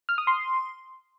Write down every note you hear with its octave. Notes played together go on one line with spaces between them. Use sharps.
F6
D#6
C6